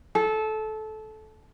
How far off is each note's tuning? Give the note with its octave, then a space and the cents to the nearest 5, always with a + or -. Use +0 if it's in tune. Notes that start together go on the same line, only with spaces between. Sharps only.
A4 -20